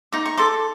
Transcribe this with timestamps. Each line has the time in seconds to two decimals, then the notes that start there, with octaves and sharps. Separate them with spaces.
0.12 D#4 D6
0.26 C#6
0.37 A4 C6 D6